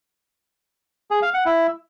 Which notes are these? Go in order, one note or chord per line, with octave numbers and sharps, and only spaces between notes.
G#4
F5
F#5
E4